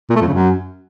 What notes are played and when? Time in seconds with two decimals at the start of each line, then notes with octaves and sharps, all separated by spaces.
0.10 A#2
0.16 A3
0.22 F2
0.27 C#3
0.33 F#2